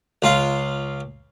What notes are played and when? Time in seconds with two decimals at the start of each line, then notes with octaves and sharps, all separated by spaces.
0.22 C#2 F4 F5